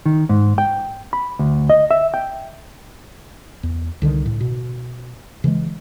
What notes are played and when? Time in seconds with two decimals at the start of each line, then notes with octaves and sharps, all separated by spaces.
0.06 D#3
0.29 G#2
0.58 G5
1.13 B5
1.39 D2
1.69 D#5
1.91 E5
2.14 G5
3.63 E2
4.02 C2 D3 D#3
4.26 A2
4.40 B2
5.44 C#3 E3 F#3 G#3